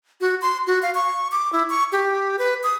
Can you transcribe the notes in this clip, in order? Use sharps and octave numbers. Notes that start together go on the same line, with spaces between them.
F#4
C6
F#4
F5
C#6
D6
E4
C#6
G4
B4
D#6